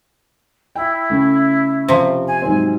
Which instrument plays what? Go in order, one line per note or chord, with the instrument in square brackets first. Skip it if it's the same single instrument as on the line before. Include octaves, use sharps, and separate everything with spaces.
[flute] E4 [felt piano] G5
[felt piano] C#3 A3
[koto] C3 F3
[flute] G#5
[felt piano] G#2 F#3 C4